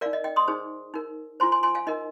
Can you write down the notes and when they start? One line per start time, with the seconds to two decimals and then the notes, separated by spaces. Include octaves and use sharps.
0.01 A#4 D5 F5
0.06 D#4
0.13 D#5
0.24 D#5 G5
0.36 C6 D#6
0.48 D#4 G#4 C5
0.94 D#4 A#4
1.40 F4 C5 G#5 C6
1.52 G#5 C6
1.63 G#5 C6
1.75 F5 G#5
1.87 D#4 A#4 D#5